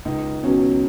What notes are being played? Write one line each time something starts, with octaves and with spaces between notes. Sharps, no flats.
C#2 D#4
B2 F#3 C#4